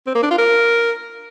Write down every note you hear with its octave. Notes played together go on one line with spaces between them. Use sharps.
C4
A#3
D4
F4
A#4